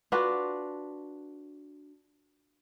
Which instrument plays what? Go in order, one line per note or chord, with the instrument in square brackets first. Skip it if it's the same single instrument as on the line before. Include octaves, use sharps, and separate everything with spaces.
[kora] D4 F4 F#4 B4